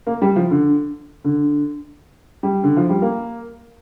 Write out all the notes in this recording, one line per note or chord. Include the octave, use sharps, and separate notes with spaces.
A#3
G3
F3
D3
D3
G3
D3
F3
G3
A#3